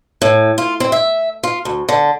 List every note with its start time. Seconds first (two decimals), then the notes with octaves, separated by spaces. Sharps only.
0.22 A2
0.58 F4
0.80 C4
0.92 E5
1.43 F4
1.65 D2
1.89 D3